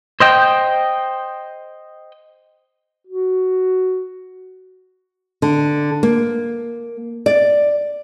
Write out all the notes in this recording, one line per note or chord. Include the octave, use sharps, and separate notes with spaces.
C5 D#5 G5
F#4
D3
A#3
D5